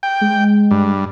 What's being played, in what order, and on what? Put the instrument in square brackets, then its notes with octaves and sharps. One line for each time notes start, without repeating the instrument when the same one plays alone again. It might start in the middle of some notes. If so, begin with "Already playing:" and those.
[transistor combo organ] G5
[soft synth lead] G#3
[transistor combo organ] G2